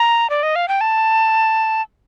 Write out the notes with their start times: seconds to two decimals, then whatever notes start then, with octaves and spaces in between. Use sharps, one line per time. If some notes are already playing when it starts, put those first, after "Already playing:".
Already playing: A#5
0.30 D5
0.43 D#5
0.56 F5
0.68 G5
0.81 A5